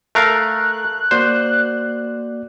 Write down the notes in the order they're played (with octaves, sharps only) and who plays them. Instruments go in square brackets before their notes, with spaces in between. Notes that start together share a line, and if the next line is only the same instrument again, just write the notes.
[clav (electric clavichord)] A3 A#4 F5 [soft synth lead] F#6
[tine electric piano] A#3 F#4 D5 [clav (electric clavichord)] C5